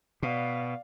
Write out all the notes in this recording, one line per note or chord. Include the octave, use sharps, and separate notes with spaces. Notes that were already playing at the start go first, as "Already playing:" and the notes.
B2 D5 F5